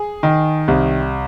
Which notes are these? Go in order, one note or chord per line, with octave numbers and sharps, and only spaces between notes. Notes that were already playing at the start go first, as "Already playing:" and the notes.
Already playing: G#4
D#3
C2